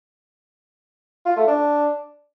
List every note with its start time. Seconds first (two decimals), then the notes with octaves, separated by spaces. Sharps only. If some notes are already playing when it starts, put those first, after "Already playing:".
1.26 F4
1.37 A3
1.48 D4